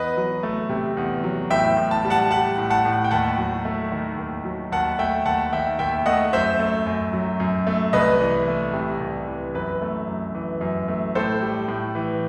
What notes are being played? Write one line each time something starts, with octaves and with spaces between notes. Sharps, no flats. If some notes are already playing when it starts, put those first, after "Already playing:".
Already playing: E2 B4 D#5
F#3
A3
C3
E2
F#3
A2 E5 G5
A2
A5
G3
F#5 A5
G3 F#5 A5
A2
F#5 A5
A2
G5
D#2 F#5 A5
F#3
A3
D#3
D#2
F#3
D#2 F#5 A5
A3 E5 G5
D#2 F#5 A5
D#3 E5 G5
D#2 E5 G5
A3 D#5 F#5
F#2 C5 E5
A3
F#2
F#3
F#2
A3
C2 B4 D#5
E3
A3
C3
C2
E3
F#2 B4
A3
F#2
E3
F#2
A3
A2 A4 C5
G3
A2
E3